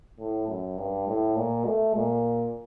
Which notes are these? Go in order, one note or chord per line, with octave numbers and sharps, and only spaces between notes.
A2
F#2
G2
A2
A#2
A3
A#2